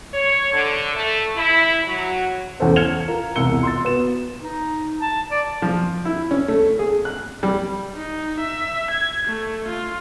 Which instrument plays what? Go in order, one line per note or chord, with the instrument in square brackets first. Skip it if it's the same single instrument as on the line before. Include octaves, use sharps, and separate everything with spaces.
[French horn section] C#5
D3
A3
E4
F#3
[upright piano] E2 C#4 A4 C5
F6 G#6 C#7 E7 F7 G7
F4 A#4
E1 C2 E4 E6 C#7 G7
C6 E6 A6
B3 F#4 E7
[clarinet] D#4
A5
D5
[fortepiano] F3
E4
C#4
A3
G#4
F#6
G3
[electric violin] D#4
E5
G#6
A3
F4